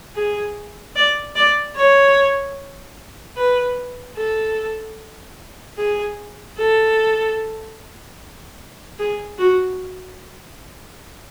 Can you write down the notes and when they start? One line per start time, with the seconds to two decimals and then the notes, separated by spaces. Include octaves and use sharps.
0.15 G#4
0.96 D5
1.36 D5
1.76 C#5
3.36 B4
4.17 A4
5.77 G#4
6.58 A4
8.99 G#4
9.39 F#4